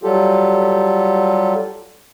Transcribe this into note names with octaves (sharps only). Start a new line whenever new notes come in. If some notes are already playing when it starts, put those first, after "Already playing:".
F#3 G3 F4 G4 A4